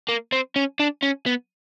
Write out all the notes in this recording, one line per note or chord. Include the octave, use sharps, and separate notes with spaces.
A#3
C4
C#4
D4
C#4
B3